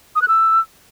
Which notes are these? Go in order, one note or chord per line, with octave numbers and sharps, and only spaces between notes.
D#6
F#6
E6